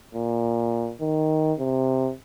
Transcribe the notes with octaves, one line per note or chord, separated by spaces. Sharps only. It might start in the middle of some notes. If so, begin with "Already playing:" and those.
A#2
D#3
C3